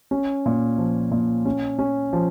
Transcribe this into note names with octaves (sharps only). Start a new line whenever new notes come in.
C#4
A#2
F3
A#2
C#4
C#4
F3